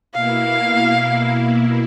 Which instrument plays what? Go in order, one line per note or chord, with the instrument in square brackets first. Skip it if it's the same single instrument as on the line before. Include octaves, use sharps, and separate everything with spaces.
[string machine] B2 A#3 E4 [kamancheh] F5